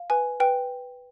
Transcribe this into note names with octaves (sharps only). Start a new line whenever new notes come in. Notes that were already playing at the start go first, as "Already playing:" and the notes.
Already playing: F5
B4 G#5
B4 G5